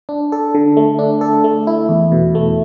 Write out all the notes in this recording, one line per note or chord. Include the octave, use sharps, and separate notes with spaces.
D4
A4
D3
A3
D4
A4
A3
E4
E2
B2
A3